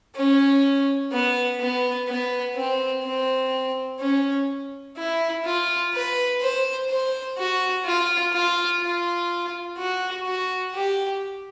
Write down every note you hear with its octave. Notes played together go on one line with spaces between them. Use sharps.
C#4
B3
B3
B3
C4
C4
C#4
E4
F4
B4
C5
C5
F#4
F4
F4
F4
F#4
F#4
G4